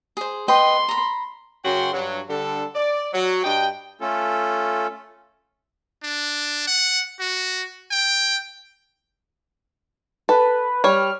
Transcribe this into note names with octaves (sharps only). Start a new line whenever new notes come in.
G#4 C5
B4 D#5 G5 C6
A#5 B5
F#2 C#3 F#3 F#4 G5 C6
G2 F#3
D3 G3 A4
D5
F#3
G2 D4 D#5 G5
A3 C#4 F4 A4
D4
F#5
F#4
G5
A4 B4
G3 C#5 F6